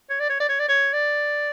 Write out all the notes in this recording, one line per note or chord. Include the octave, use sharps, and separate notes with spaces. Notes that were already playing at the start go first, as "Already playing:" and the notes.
C#5
D5
C#5
D5
C#5
D5
C#5
D5